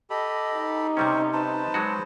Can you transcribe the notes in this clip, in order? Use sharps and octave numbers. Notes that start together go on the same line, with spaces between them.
G4 A4 D#5 B5
D#4
C3 G3 C4 C#4 C5 G5 C#6
B4 C5 A5
F#3 G#3 F#4